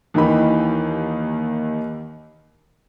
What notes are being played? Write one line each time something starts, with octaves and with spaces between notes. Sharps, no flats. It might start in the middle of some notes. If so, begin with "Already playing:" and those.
D#2 D#3 E3 D#4 G4 B5